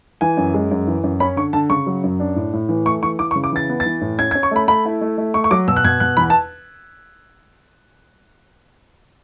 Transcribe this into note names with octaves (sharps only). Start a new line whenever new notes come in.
E3 G#5
F#2
G#3
F#2
E3
F#2
C#4 B5
D3 C#6
D3 A5
C#3 C#6
F#3
F#2
D4
A2
A2
E3
A3 C#6
E3 C#6
E3 D6
C#6
C#3
D6
E3 A6
B3
A6
E3
A2
C#4 G#6
G#6
C#4
C#6
A3 B5
A3 B5
E4
A3
A3
A3 C#6
C#6
F#3 D6
B2 E6
F#6
B2 G#6
B2 F#6
E2 B5
A5